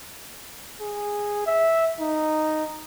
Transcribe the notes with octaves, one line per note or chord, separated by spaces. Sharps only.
G#4
E5
D#4